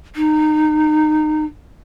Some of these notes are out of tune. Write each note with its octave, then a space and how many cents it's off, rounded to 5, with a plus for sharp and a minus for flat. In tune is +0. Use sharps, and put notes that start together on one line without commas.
D#4 -20